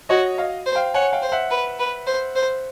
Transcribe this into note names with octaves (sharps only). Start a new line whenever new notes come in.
F#4 C#5 D#5
D#5 F5
C5
F5 G5
C#5 F#5 G#5
F5 G5
C5
E5 F#5
B4
B4
C5
C5